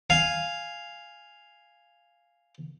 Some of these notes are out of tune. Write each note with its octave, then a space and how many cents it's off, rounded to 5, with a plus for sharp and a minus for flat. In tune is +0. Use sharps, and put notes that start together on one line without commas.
F5 +0 G#5 +0